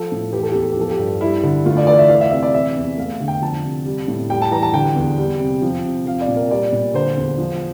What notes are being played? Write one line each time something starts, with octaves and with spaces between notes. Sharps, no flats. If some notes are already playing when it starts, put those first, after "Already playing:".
Already playing: F3 A4
A2
E3 G4
A4
E2 G4
A4
G4
F3 A4
G4
G2
G3 E4
D3
A3 F4
D5
E3 D5
E5
E3 F5
E5
C3 E5
D5
E3 E5
E2
A3 F5
D3
G5
F3 A5
C3
G3
A2
G3 G5
A5
E3 A#5
A5
D3 G5
E2
G3
C3
F3
C3
F3 F5
D5
A#2
A#4
G3 D5
A#2
D3 C5
E2
F3